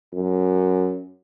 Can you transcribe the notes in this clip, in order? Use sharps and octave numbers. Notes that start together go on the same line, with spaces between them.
F#2